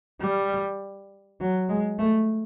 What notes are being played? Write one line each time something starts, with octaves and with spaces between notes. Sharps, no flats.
G3
F#3
G#3
A3